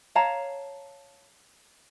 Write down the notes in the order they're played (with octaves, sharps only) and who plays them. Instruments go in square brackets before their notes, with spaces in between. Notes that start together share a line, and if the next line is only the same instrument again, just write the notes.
[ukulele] C#5 F5 A5 A#5